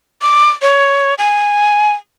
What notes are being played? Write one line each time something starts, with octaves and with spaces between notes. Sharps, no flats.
D6
C#5
G#5